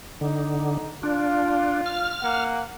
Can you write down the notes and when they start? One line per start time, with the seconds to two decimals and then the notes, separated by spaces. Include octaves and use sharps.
0.21 D3 D#4
1.03 D4 F4
1.86 F6
2.21 A#3 F#5